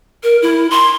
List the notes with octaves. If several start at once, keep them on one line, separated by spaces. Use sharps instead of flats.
A#4
E4
C6